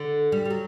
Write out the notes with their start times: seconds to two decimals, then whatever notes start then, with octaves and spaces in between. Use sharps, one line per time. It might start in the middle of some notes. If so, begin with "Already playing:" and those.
Already playing: D3
0.32 G3
0.45 G3
0.50 F#3